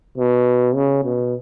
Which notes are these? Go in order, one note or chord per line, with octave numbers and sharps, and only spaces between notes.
B2
C#3
B2